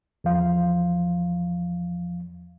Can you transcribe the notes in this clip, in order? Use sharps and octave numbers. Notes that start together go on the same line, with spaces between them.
E2 F3 F5